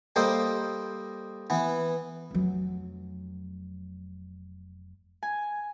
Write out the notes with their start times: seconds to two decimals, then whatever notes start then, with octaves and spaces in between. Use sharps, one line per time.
0.16 G3 A#3 A4 C5 D#5 G5
1.50 E3 B3
2.31 F1 F#3
5.23 G#5